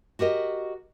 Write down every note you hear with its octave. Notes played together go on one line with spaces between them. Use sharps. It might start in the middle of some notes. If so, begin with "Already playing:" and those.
F#4 G4 A#4 D#5